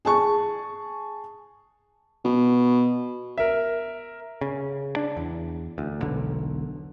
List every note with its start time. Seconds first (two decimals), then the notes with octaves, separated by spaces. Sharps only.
0.05 G#4 A5 C#6
2.25 B2
3.38 A#4 E5
4.41 C#3
4.96 D4
5.17 E2
5.78 D2
6.01 E1 B1 D3